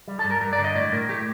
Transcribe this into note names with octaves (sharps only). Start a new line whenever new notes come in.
G3
A4
G2
A#4
G2 A#4
D5
D3
D#5
A2 D5
A2 A#4
A3 G4